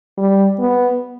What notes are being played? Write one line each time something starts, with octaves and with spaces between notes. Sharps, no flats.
G3
B3